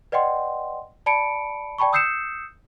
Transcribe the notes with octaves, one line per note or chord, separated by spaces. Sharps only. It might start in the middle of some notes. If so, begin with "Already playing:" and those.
B4 D5 D#5 F#5 G5 C6
D5 A5 B5 C#7 D7
D5 G5 A5 B5 C#6
D#6 E6 G6 C7 C#7 E7